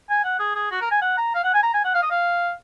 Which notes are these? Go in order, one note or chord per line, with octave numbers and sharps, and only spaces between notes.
G#5
F#5
G#4
G#4
F#4
A#4
G#5
F#5
A#5
F5
F#5
G#5
A#5
G#5
F#5
F5
D#5
F5